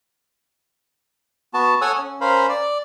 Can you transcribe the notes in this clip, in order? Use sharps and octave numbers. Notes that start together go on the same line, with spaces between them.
B3 F#4 A5
A4 C#5 F#5 G#5 D#6 E6
C#4
C#4 A#4 C5 F5 B5
D5